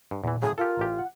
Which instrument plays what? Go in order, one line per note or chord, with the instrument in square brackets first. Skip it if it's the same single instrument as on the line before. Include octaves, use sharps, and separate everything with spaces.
[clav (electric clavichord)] G2
[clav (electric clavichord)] E2 E3 [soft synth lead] A#2
[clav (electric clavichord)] A2 C#3 F#3 [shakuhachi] G#4
[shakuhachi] F4 [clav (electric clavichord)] G4 A4 [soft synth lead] A#4
[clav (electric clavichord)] A1 G4
[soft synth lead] F#5